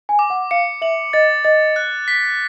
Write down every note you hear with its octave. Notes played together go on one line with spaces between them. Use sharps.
G#5
D6
F#5
F5 C#7
E5 F#7
D#5 A6
D#5 A6
F#6
B6